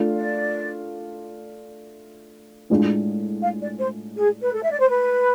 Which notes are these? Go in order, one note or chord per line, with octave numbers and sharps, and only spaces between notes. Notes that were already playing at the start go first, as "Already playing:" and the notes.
Already playing: A3 D4 F4
D5
A2 G#3 D4 F4
F5
D5
C5
G#4
B4
A4
E5
D5
C5
B4